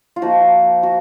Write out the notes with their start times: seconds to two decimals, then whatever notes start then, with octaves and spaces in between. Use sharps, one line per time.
0.16 F4
0.22 F3 A#3 D#4 F#4
0.83 F#4